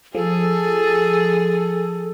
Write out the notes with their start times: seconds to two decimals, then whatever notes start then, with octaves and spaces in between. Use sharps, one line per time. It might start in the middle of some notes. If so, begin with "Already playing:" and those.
0.15 F3 G#4 A4